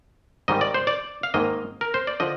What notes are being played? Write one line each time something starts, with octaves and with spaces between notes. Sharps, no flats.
G#2 D#3 G3 D#5
D5
C5
D5
F5
G#2 D#3 A#3 D#5
A#4
C5
D5
D3 F3 D#5